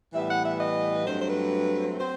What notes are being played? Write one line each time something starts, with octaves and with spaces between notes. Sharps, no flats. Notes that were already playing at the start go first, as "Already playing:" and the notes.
A2 E3 G3 B3 E5
F#5
E5
D#5
B4
G2 F#3 A3 C4 C5
C5
B4
F#3 C4 C5